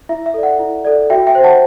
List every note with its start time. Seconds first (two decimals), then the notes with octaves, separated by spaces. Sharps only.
0.09 E4 E5
0.26 E5
0.34 A4 D5
0.43 F#5
0.59 E4
0.85 A4 D5
1.10 F#4 E5 G5
1.27 E5 G5
1.35 C5
1.44 F#5 A5